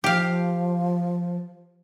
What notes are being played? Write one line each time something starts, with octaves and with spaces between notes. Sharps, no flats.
F3 G4 F5